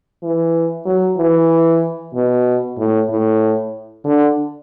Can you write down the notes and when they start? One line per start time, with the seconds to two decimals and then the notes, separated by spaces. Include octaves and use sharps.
0.23 E3
0.85 F#3
1.17 E3
2.14 B2
2.78 A2
3.10 A2
4.05 D3